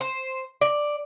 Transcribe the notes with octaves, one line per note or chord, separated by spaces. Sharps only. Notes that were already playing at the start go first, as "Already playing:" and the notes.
C5
D5